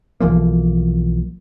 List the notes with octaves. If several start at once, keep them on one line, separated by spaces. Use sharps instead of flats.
B1 E3 F3 A#3